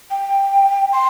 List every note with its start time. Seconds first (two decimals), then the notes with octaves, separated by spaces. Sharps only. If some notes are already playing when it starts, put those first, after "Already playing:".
0.10 G5
0.93 C6